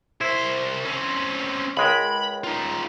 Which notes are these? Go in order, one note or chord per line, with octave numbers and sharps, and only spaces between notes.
C2 E4 C5
C4 C#4
C#2 G#3 A#4 B5
D#4 F4